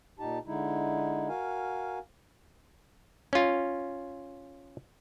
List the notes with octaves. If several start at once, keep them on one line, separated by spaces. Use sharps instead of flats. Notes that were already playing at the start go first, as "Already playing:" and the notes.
A#2 D#4 G4 A5
D3 G#3 D#4 E4
F#4 A#4 F5 G#5
C#4 F4